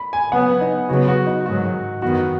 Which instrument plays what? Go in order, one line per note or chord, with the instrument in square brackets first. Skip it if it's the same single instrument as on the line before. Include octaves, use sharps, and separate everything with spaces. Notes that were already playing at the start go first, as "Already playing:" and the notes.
Already playing: [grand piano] B5
G#5
[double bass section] C#3 F#3 B3 [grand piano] F#5
[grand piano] D#4
[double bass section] C#3 F#3 B3 [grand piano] F#4
[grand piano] F#4
D#4
[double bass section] G#2 D#3 F#3 [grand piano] F#4
[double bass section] F#2 D#3 B3 [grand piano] F#4